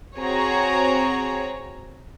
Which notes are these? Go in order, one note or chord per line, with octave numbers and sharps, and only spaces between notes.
C4 F#4 G#4 C#5 A#5